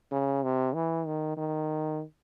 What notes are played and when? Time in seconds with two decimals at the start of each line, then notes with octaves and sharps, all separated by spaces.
0.12 C#3
0.43 C3
0.75 E3
1.07 D#3
1.37 D#3